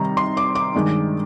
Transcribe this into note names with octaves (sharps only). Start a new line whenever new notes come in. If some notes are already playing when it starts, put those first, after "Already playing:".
Already playing: C3 D#3 G3 A#5
C6
D6
D6
G2 D#3 G#3 D4